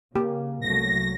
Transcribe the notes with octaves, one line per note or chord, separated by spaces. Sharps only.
C#3 A#3 G4
C2 F#3 A3 A#6